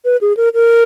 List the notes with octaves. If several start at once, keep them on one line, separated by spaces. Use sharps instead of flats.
B4
G#4
A#4
A#4